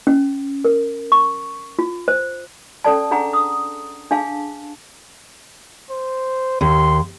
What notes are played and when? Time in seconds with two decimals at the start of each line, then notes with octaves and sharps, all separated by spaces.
0.07 C#4
0.65 A#4
1.12 C#6
1.79 F4
2.08 C5
2.84 C#4 A4 D5 A5
3.11 D4 G#4 F#5 A#5
3.33 D#6
4.11 D4 G#4 F5 A5
5.90 C5
6.61 D#2 C6